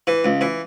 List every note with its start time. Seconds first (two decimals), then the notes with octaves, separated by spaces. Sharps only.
0.07 E3
0.24 C#2
0.41 E3